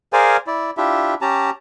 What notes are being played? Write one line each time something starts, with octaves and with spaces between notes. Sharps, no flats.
G#4 A#4 C5 D5 F5 G#5
E4 D5
D4 E4 F4 G4 E5
C#4 G4 A5 A#5